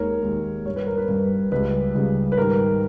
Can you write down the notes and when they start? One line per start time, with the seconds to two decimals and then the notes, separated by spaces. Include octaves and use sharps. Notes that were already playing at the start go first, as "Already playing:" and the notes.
Already playing: D#2 D#3 G#3 A#4 C#5
0.23 D#2 D#3 G#3
0.66 G2 G3 C#5
0.76 B4
0.87 A#4
0.98 B4
1.09 G2 G3
1.52 C#2 C#3 G3 B4
1.94 C#2 C#3 G3
2.32 B4
2.37 G#2 D#3 G3 A#4